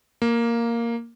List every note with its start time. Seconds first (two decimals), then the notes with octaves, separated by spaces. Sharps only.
0.22 A#3